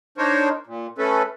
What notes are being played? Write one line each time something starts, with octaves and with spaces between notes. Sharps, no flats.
D4 D#4 A#4 C5 C#5
A#2
A3 C#4 A4 B4